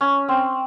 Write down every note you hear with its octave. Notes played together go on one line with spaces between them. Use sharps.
C#4
C4